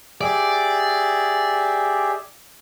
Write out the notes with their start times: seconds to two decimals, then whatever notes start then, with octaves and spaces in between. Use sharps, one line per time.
0.21 G4 G#4 D5 E5